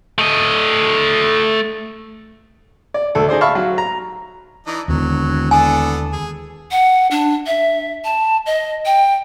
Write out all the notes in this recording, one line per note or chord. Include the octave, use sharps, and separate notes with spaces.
A3 D#5
D5
D2 A4
D#4 G#4 C5 D5
E5 F5 A5 B5 C#6 F6
F#3
A#5
E3 D4 D#4
E1 D#2 D3 F#3
B3 D4 A4 G#5
G#4
F#5
D4
E5
A5
D#5
G5